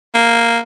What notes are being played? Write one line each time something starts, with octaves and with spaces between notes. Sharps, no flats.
A#3